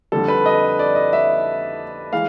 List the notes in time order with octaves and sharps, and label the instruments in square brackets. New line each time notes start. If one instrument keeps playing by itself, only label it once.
[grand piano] F2 D3 G3 A4
B4
D#5
D5
D#5
E5
E3 G#3 F5